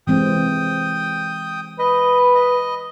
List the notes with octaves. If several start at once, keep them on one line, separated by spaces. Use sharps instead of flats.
E3 G#3 C4 G5 D#6
B4 D#5
D#5